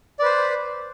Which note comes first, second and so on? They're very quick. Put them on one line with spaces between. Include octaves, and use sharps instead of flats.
D5 B4 C5